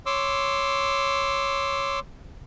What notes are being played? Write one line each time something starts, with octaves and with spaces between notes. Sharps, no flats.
C#5 C6 D6 E6